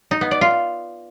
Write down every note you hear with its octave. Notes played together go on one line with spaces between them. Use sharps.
D#4
B3
D5
F4